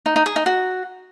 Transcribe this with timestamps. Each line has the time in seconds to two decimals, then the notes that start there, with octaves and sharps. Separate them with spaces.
0.06 D#4
0.16 D#4
0.26 G#4
0.36 D#4
0.46 F#4